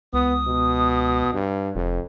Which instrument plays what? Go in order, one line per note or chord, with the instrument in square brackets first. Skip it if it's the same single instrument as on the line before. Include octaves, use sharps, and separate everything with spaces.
[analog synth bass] C#2 [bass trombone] B3 [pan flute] D#6
[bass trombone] B2
G2
[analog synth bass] F1 [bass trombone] F2